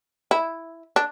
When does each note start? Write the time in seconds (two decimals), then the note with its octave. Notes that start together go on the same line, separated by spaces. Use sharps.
0.31 E4
0.96 D4